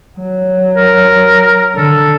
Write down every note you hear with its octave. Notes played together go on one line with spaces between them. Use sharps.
F#3
A#4
D3 A4